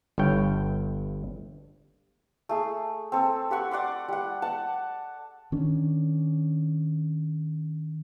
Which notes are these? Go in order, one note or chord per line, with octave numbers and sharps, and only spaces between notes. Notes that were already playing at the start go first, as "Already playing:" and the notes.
G1 G2 C#5 G5
A3 G#4
C4 A4
G4 F#5 C#6
D5 F#5 C6 D6
G3 F#5
F#5 A5
D#3 C#4 D4